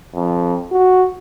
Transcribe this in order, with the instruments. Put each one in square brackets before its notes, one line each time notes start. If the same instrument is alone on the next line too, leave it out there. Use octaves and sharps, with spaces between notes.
[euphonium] F2
F#4